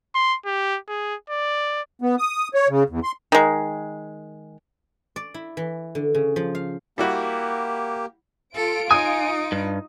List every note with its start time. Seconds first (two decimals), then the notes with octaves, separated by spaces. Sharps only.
0.15 C6
0.45 G4
0.88 G#4
1.30 D5
2.02 B3
2.18 D#6
2.54 C#5
2.69 C#3
2.89 E2
3.04 C6
3.32 D#3 G#3
5.16 D5
5.34 E4
5.57 E3
5.95 D3
6.15 C#3
6.36 F3
6.55 F5
6.98 G3 A#3 E4 F#4 G4
8.55 F4 A4 D7
8.91 D#4 G#5 D#6
9.52 G2